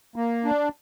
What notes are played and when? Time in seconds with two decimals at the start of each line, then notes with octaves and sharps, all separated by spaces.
0.16 A#3
0.45 D4